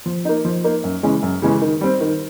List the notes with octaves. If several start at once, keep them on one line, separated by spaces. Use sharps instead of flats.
F3
A#3 D#4
F3
A#3 D#4
F#2
C#3 E3 G#3 C#4
F#2
C#3 E3 G#3 C#4
D#3
G3 C4
D#3